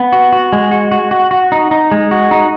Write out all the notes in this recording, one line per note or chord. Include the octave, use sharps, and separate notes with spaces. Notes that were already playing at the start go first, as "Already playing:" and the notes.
Already playing: B3
F#4
F#4
G#3
F#4
F#4
F#4
F#4
D#4
D#4
G#3
F#4
D#4